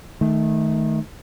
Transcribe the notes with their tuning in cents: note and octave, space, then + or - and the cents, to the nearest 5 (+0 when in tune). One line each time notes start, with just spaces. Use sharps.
D#3 +0 A3 -20